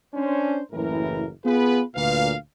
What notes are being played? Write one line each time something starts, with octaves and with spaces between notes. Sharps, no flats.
C#4 D4 C5
F#1 A2 E3 A#4
B3 F4 G#4 B4
D2 A#2 B4 F5